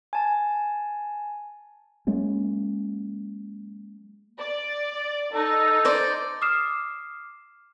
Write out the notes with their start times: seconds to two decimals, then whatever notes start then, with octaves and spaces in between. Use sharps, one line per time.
0.13 G#5 A5
2.07 F#3 G#3 A#3 C#4
4.38 D5
5.33 D#4 A4
5.85 C5 D5
6.42 D6 D#6 F6 C7 E7